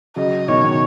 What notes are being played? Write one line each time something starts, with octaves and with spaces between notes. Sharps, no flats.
C#3 F#3 D#5
B2 D#3 C#5
B2